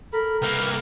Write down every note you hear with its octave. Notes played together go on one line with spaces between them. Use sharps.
A4 A#4 B5
C2 A#3 A#4 B4 G5